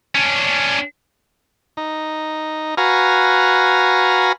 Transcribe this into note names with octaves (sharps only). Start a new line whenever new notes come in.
C#4 D4
D#4
F#4 B4 F5 G#5 A#5